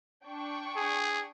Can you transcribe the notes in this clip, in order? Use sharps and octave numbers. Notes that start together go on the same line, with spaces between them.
D4 G5 C#6
G#4